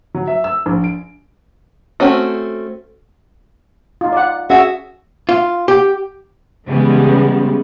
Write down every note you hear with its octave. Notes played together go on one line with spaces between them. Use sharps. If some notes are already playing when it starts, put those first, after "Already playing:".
F#3
E5
E6
A#1
D7
A3 C4 C#4 F#4
D#4 F4
D5 F#5
C#4 F#4 G#4 E5
F4
G4
C#3 E3 G3 G#3 B3